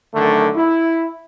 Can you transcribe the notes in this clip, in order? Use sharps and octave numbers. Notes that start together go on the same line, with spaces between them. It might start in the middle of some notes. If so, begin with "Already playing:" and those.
F#2 D3 D#3 A3
E4